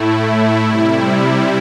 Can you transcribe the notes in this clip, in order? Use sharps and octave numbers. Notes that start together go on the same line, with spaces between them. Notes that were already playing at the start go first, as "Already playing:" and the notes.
Already playing: A2 A3 E4
C3 G3 E4